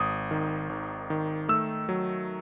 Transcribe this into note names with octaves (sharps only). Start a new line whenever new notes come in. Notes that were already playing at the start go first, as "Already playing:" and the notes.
Already playing: G#1 D#6
D#3
G#1
D#3
A3 E6
F#3